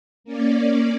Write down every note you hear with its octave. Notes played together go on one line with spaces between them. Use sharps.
A#3 C#4 D5